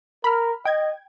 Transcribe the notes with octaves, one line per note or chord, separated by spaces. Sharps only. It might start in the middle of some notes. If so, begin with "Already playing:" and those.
A#4 B5 F6
D#5 G5 G#6